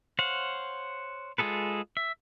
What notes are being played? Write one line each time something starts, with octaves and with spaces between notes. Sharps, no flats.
C5 C#5 F5 F#5
G#3 F4 G#4 A4 B4
E5